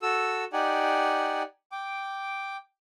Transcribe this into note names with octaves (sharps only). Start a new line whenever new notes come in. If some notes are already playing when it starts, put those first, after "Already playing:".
F#4 A4 E6
D#4 G4 D5 F#5 G#5
G5 D6